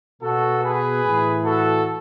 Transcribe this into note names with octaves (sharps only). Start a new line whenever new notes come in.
B2 F#4 A4
G#4 B4
A2 E3
F#4 A4